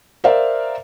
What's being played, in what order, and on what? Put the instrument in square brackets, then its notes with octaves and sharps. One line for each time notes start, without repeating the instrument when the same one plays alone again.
[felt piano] A#4 C5 D5 E5 F5